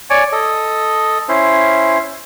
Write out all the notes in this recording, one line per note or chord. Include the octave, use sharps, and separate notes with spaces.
C#5 D5 G#5
A4 D#5
C#4 E4 C5